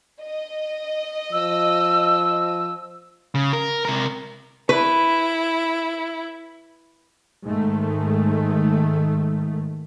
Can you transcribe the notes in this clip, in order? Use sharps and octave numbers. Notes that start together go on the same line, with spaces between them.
D#5
F3 E6
C#3
A#4
C3 A#4
E4 B4
G#2 D#3 A3